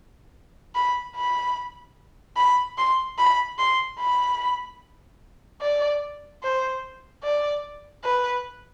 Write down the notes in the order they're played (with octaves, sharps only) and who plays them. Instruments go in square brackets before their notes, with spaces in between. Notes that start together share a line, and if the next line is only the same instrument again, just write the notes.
[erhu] B5
B5
B5
C6
B5
C6
B5
D5
C5
D5
B4